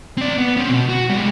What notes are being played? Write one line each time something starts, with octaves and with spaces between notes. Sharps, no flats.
C4 D5
B3
C4 C#4
B2
F#4
G3 G#3